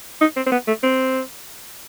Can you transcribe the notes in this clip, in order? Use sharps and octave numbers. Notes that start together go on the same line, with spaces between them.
D#4
C4
C4
B3
A3
C4